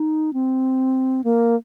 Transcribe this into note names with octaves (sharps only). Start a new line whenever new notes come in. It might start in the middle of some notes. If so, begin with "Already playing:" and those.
Already playing: D#4
C4
A#3